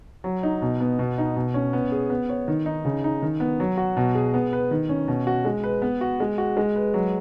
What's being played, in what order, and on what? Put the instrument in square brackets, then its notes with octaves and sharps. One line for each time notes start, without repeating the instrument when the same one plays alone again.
[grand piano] F#3
D#4
B2
B3
B2
D#4
B2
C#4
B3
G#4
B3
C#5
D#3
D#4
C#3
D#4
D#3
B3
F#3
F#4
B2
G#4
B3
B4
D#3
C#4
B2
F#4
G#3
B4
B3
F#4
G#3
F#4
G#3
B4
F#3